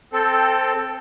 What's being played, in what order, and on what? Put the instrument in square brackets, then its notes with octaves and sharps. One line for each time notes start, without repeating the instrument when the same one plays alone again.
[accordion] C4 A4